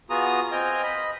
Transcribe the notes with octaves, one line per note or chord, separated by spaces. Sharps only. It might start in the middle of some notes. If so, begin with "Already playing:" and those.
B3 F4 F#4 G#4 A#5 D#6
C4 D#5 G5 G#5 F6
D#5 B5